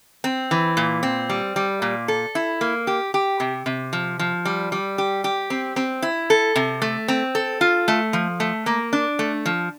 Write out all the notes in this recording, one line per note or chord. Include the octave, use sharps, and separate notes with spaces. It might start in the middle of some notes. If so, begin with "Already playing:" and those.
C4
E3
A#2
C4
G3
G3
A#2
A4
E4
A#3
G4
G4
C3
C3
F3
F3
G3
G3
G4
G4
C4
C4
E4
A4
C3
A3
C4
A4
F4
A3
F3
A3
A#3
D4
A3
F3